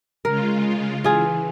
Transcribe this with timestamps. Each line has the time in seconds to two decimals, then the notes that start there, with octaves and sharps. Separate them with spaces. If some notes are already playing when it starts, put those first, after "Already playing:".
0.25 C#3 G#3 F4 A#4
1.04 E3 F4 G#4